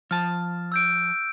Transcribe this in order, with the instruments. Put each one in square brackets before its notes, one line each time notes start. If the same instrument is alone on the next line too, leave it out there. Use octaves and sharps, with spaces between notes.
[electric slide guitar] F3 A5 [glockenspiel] F6
[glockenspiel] E6 G6 D7